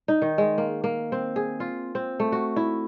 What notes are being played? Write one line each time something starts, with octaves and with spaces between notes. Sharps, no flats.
D#4
D#3
G#3
A#3
A#3
C4
G#4
F4
C4
A3
F#4
E4